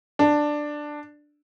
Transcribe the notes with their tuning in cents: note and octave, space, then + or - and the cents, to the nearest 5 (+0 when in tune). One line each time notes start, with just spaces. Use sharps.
D4 +10